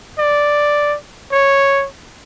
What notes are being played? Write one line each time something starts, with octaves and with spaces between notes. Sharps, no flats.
D5
C#5